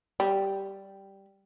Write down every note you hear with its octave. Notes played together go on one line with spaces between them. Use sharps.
G3